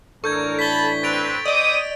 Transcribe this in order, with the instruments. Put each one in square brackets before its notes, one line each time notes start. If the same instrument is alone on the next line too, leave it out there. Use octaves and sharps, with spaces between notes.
[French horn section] A2 E3 D4 [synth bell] A4 [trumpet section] A#4 [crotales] C#6 G6 G#6
[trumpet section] A5 B5 [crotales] B6 G7
[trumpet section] C4 B4 [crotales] A6 D7 F7
[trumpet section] C4 D6 D#6 [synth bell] D5 D#5